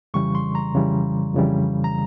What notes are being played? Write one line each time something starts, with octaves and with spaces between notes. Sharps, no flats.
F2 C#3 E3 G3 C#6
C6
A#5
F2 C#3 E3 G3
F2 C#3 E3 G3
A#5